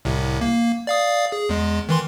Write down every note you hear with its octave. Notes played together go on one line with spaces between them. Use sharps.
C2 A2 C3
A#3
D5 F5 D#6
G#4
E2 G#3
D#3 E3 C6